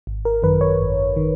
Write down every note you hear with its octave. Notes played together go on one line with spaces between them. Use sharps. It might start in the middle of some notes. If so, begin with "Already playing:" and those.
G#1
A#4
F#2 D#3 B4
C#5
G#1
D#3